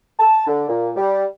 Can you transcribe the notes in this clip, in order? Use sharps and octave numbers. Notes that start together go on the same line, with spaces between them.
A5
D3
A#2
G3